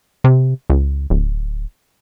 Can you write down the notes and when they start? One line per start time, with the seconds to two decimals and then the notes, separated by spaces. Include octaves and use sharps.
0.24 C3
0.70 C#2
1.10 D1